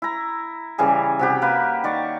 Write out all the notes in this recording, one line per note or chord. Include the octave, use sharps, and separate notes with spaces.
E4 A#5
C#3 E3 G3 G#4
C3 F#4 G4
A#3 B4 B5
D#3 D5 A#5 C#6